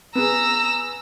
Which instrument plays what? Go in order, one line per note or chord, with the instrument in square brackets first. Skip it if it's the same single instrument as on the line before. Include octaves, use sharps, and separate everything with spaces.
[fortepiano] B3 G#4 [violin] A#5 E6